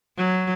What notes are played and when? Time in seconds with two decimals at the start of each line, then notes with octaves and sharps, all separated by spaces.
0.18 F#3